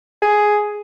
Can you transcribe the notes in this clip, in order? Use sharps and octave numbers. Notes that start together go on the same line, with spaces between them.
G#4